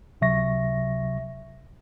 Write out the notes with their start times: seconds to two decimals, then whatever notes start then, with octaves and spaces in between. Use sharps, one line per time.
0.21 C#2 C3 F#3 E5 C#6 A#6